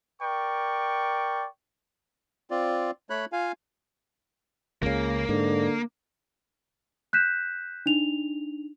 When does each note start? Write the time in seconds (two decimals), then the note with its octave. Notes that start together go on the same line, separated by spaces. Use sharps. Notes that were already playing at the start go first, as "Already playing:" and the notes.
0.21 A#4 D5 G5 C#6
2.51 C4 F4 D5
3.10 A3 C#5 B5 F#6
3.32 F4 F5 G#5
4.83 C#2 C#3 A#3
5.29 G#2 D3
7.13 F#6 G6 B6 E7
7.86 D4 D#4 F7